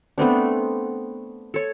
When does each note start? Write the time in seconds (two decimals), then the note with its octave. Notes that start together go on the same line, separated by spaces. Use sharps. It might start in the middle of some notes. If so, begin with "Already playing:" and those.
0.18 A3 B3 C4 D4
1.54 A4 C#5